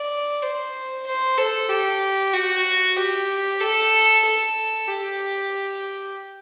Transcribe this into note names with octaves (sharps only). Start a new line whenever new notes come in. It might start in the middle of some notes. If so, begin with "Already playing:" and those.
Already playing: D5
C5
C5
A4
G4
F#4
G4
A4
A4
G4